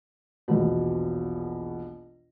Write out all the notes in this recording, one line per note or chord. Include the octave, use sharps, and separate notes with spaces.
A#1 E2 B2